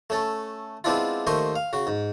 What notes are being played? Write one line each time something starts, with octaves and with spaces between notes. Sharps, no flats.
A3 C#4 A4
G#3 B3 C4 D4 E4 F4
D#2 A3 C5 D#5 C6 C#6
F5
C#3 F#4
G#2